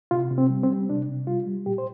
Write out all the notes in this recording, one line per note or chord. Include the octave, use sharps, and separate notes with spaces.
C3 F4
C3
C4
G3
C4
G3
C3 D4
C3
G3 F4
G3
A#2 G4
C5